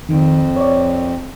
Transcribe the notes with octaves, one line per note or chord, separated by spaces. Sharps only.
F2 D#3
C#5 D5